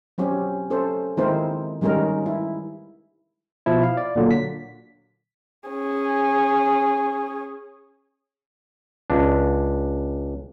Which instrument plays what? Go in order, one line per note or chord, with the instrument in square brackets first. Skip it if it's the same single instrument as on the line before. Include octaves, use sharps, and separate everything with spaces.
[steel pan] F#3 C4 C#4 G4
C#4 A4 C5
D#3 G#3 C4 E4 A#4 C5
D#3 G3 G#3 C#4 D#4 A#4
E4
[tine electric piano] B2 F3 E4
F5
D5
A#2 D3 F#3 A#3
B6
[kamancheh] C#4 G#4
[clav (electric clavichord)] C#2 D4